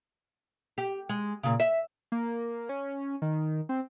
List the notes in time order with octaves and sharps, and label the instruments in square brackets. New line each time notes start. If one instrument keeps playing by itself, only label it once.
[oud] G4
G#3
A#2 C#3
E5
[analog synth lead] A#3
C#4
D#3
C4